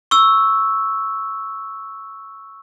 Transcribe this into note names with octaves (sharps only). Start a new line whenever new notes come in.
C#6 E6